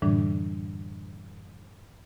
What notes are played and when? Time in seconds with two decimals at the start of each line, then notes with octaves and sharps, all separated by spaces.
0.02 F#2 A2 D3 E3 G3 D4